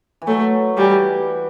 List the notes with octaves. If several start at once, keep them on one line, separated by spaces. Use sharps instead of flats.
E3
F#3 A3
E3 G3